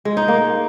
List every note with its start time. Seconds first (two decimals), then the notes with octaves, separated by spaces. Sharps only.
0.05 G#3
0.17 D#4
0.28 A#3